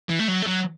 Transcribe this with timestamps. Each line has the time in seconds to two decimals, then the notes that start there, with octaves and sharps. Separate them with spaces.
0.09 E3
0.19 A3
0.28 F#3
0.42 A3
0.46 F#3